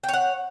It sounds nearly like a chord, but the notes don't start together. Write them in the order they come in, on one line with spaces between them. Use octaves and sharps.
G5 C#5 F#5